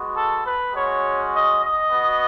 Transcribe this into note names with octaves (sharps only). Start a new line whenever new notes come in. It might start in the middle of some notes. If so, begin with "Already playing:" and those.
Already playing: G#3 B3 F#4
A4
B4
G#3 C#4 F#4 C#5
D#5
D#5
B3 F#4